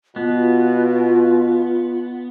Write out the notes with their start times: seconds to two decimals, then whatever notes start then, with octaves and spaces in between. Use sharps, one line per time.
0.16 B2 B3 F4